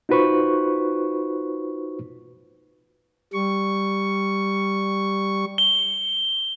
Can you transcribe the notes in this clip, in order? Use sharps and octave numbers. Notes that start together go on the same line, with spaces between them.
D#4 F4 F#4 B4 C5 C#6
G3 C#6
G7